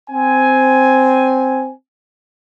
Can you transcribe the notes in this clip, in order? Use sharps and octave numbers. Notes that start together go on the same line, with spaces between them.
C4 G#5